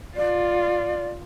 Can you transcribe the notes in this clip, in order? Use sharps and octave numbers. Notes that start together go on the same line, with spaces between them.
F4 D5